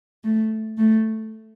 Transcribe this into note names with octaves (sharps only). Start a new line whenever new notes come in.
A3
A3